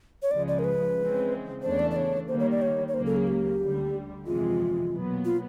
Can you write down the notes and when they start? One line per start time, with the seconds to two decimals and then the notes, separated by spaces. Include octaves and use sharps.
0.22 C#5
0.31 C#2 C#3 F3 G#3 D5
0.48 D5
0.59 A#4
0.64 B4
0.97 C#3 E3 G#3 C4
1.62 E2 C#3 E3 A3 D4 C5
1.71 C#5
1.79 D5
1.91 D5
1.96 C#5
2.28 D#3 G3 A#3 C5
2.39 C#5
2.51 D5
2.62 C#5
2.88 C#5
2.94 C#2 C#3 F#3 A#3 C5
3.06 A4
3.16 G#4
3.27 G4
3.60 D2 D3 G3
4.26 G1 F2 C3 E3 G#3 F4
4.91 B1 A#2 F#3 B3
5.25 F4